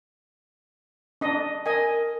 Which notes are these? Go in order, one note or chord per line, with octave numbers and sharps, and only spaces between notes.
D4 D#5
A#4 D#5 G#5